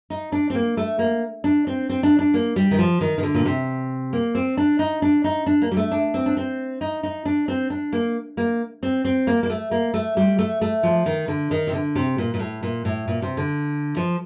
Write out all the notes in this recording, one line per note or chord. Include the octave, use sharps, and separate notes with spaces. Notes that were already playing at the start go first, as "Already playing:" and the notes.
D#4
D4
C4
A#3
A3
A#3
D4
C4
C4
D4
D4
A#3
G3
D#3
F3
D#3
D#3
D3
A#2
C3
A#3
C4
D4
D#4
D4
D#4
D4
A#3
G3
A3
D4
C4
D4
C4
D#4
D#4
D4
C4
D4
A#3
A#3
C4
C4
A#3
A#3
A3
A#3
A3
G3
A3
A3
F3
D#3
D3
D#3
C3
D3
C3
A#2
A#2
A2
A#2
A2
A#2
C3
D3
F3